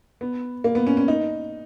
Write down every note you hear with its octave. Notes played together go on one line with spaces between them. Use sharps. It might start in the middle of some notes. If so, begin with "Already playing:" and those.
B3
A#3
B3
C#4
C#4
D#4